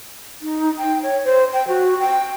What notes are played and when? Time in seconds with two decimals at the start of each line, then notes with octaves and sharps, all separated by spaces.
0.42 D#4
0.78 G5
1.03 C#5
1.24 C5
1.53 G5
1.68 F#4
1.99 G5